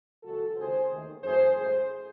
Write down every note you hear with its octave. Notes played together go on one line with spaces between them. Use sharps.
F#1 F#2 C#3 E3 G#3 F#4 A4
C#2 C3 D#3 G#4 C5
D#2 D#3 A3
F#2 E3 A3 G#4 C5
A1 A2 E3 G#3 G#4 C5